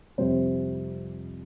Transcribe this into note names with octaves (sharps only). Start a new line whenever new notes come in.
F2 C3 G3 C5